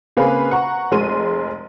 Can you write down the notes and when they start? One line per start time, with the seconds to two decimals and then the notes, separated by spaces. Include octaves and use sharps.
0.17 C#3 A#3 C4 G#4 B4 F5
0.51 F#5 A#5 C#6
0.92 F1 G#3 C6 D#7